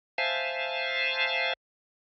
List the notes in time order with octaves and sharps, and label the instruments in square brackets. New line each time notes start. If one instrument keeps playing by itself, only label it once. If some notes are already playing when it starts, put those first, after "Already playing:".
[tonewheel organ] C5 E5 F5 G#5 A5